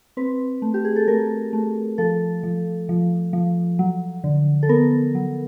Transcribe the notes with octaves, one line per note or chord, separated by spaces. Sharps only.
C4 B4
A3
G4
G#4
A4
A3 A#4
A3
F3 A4
F3
F3
F3
F#3
D3
A4
B3 A#4
F#3